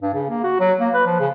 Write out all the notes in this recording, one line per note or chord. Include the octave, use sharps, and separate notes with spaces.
G2
C#3
A#3
F#4
F#3
A#3
B4
F3
C#3